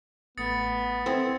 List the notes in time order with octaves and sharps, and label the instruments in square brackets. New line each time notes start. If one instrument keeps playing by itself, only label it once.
[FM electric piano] A1 A3 [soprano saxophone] B3 [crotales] D#6 A6 C#7
[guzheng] C4 [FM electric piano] E4 A4 G#6